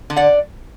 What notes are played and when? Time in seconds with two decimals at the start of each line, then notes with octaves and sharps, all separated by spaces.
0.10 D3
0.16 D5 F#5